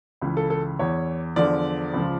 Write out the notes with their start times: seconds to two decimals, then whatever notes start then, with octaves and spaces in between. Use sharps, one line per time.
0.21 C#2 C#3 E3
0.37 A4
0.50 A4
0.79 E2 E3 C#5
1.36 E2 D3 F3 D5
1.93 C#2 C#3 F3